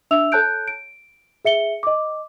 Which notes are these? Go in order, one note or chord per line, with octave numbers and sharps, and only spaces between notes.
D4 E5 E6 F7
A4 C#5 A5 F#6 G6 D7
D7
G#4 E5 C#7 G7
D#5 D6